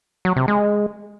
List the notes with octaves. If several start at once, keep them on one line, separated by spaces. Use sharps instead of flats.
F#3
C3
G#3